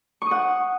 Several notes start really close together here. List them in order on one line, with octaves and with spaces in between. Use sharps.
C#6 D#6 F#5